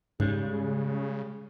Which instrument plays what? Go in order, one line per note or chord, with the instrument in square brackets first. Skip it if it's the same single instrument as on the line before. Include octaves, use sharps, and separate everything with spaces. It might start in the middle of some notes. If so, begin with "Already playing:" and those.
[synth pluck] G#2 [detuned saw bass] C#3 [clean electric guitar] G3 G#3